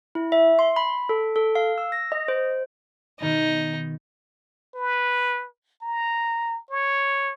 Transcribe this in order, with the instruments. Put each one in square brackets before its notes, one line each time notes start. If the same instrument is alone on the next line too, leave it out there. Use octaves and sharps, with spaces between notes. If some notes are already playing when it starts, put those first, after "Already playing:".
[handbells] E4
E5
C6
B5
A4
A4
F5
E6
A#6
D#5
C5
[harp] B2 D#3 B3 [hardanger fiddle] D#4
[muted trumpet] B4
A#5
C#5